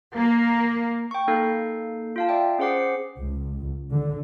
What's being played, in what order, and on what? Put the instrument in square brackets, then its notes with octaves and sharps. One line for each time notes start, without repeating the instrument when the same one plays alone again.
[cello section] A#3
[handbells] G5 C#6
A#3 D#4 A4 G6 C7
F4 F5 A5
D5 E5 G5
C#4 G#4 C5 F#5 D6 C7
[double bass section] C#2
D3